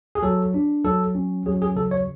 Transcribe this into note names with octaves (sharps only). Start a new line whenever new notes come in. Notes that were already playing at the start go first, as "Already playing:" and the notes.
G#4
F#3 A4
D4
F#3 A4
C#4
F#3 G#4
G#4
C#3 A4
C#5